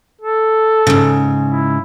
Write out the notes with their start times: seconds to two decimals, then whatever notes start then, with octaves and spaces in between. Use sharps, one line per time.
0.22 A4
0.87 G#2 C#3
1.46 E4